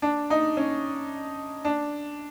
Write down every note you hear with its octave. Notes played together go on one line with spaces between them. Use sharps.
D4
D#4
C#4
D4